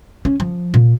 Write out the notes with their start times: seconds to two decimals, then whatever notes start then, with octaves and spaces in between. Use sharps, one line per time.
0.25 C#4
0.40 F3
0.74 A#2